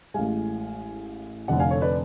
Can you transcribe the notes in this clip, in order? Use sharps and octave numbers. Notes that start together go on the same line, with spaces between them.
A1 A2 G#3 F5 G#5
F1 F2 D3 D5 F#5
F5 G#5
A4 C#5
B4 D5